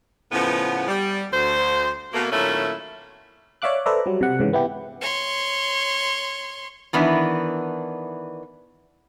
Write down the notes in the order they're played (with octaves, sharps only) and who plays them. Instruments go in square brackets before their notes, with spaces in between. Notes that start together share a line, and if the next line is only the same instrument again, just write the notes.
[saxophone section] A2 C#3 F3 B3
G3
D2 C5
B2 A3 A#3
A#2 D#3 F#3 A3 C#4 E4
[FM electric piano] C#5 D5 E5 F5 D6 F#6
A4 B4 C5 D5 E5 A#5
F#3 G3
C3 F#5
G#2 C#3 E3
B3 E4 G4
[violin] C#5 C6
[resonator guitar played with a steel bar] D#3 E3 B3 D4 E4